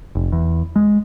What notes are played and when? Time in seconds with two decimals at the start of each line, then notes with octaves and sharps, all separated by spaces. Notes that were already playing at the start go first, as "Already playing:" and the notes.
0.15 F1
0.32 E2
0.76 G#3